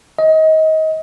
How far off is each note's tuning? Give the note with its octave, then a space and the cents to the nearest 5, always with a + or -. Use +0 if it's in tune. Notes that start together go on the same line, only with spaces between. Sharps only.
D#5 +25